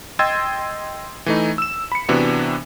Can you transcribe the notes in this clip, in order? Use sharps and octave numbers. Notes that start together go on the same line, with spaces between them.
D#5 G5 C6 E6 G#6 A6
E3 A3 D#4
E6 E7
B5 C#7
C3 E3 B3 D4 F#4